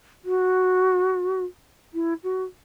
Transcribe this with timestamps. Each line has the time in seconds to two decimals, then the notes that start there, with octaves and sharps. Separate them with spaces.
0.25 F#4
1.94 E4
2.23 F#4